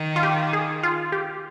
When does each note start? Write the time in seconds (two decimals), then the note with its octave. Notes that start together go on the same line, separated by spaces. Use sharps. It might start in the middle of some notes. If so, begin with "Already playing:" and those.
Already playing: D#3
0.16 F4
0.23 G4
0.53 G#4
0.83 F4
1.12 G4